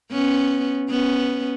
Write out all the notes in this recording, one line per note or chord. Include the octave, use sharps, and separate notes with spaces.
B3 C#4
B3 C#4